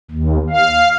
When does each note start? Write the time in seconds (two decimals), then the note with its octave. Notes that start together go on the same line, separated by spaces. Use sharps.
0.11 D#2
0.50 F5